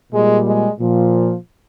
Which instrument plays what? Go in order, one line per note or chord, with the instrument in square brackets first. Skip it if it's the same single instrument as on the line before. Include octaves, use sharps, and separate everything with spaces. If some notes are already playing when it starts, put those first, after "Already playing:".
[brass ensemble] A#2 G3 G#3
G#3
A#2 F3